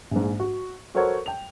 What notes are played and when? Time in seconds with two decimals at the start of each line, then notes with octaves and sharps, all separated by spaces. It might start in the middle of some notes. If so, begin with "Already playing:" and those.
0.11 A#1 G#2
0.40 F#4
0.95 F#4 A4 A#4 C5 C#5 F#5
1.26 G5 F7